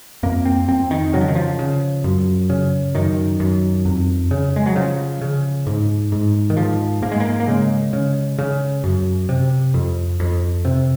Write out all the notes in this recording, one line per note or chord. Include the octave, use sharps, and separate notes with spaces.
F2 A#3
C4
F2 C4
D#3
C#3 F#3
F3
D#3
F3
C#3
F#2
C#3
F#2 D#3
F#2
F2
C#3
G#3
F#3
C#3 F3
C#3
G#2
G#2
D#3
G#2 F3
G#2 A#3
G#3
A#3
A#3
C#3 G#3
C#3
C#3
F#2
C3
F2
F2
C3